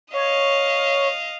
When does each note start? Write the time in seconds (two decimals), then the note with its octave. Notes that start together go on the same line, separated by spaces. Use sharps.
0.14 C#5 D#5 F5